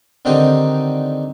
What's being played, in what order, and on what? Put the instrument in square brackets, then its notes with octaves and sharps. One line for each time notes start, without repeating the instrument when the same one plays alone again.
[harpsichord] D3 D#3 C4 D#4 G4